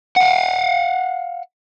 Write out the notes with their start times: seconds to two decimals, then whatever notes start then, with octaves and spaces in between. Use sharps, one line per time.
0.17 F5 F#5